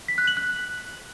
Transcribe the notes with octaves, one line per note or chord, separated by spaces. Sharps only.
B6
F#6
F#7
F#6